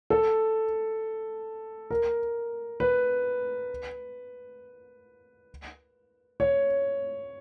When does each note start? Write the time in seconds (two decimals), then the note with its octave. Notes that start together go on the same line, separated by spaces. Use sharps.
0.10 A4
1.91 A#4
2.80 B4
6.40 C#5